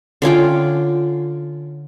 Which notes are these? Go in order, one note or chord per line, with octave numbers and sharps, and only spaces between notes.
D3 C#4 F4 G5